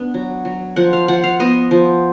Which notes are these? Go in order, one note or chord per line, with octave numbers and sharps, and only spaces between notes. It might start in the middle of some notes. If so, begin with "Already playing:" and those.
Already playing: B3 D4
F#3
F#3
F3 F#5
F5
F3 F#5
F5
B3 D#5
F3